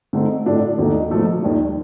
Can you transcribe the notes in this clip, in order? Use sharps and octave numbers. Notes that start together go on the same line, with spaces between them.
D3 A3 C4 D#4
A2 A3 D4
D#2 D3 A3 D#4
A#2 F3 A3 D#4
D#2 D#3 G3 D4